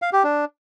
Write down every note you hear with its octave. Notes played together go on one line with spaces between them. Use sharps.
F5
G4
D4